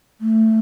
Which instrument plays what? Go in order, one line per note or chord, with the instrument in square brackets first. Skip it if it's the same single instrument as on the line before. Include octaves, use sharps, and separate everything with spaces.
[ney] A3